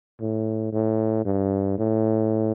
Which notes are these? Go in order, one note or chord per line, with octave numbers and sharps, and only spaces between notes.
A2
A2
G2
A2